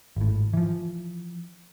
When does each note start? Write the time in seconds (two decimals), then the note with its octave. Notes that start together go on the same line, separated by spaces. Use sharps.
0.16 G#1 A2
0.53 E3 F3